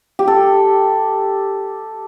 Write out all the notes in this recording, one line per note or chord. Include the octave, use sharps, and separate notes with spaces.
G4
A4